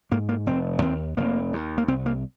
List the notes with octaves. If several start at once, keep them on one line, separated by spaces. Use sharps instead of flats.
G#2 A#3
A#3
F1 C4
D#2 C4
F1 A#3
D#2
A#3
C2 C4
A#3